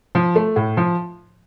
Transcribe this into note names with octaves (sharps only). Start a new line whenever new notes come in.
F3
A3
A2
F3